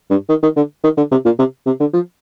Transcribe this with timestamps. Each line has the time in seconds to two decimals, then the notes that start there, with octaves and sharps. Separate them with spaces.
0.10 G2
0.29 D#3
0.43 D#3
0.56 D3
0.84 D#3
0.97 D3
1.11 C3
1.25 A#2
1.39 C3
1.66 C3
1.80 D3
1.93 F3